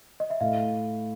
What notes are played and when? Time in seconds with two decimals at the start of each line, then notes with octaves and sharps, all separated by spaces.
0.20 D#5
0.30 E5
0.40 A2 F5